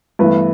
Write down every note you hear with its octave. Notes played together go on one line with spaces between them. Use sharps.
G2 E3 A3 B3 B4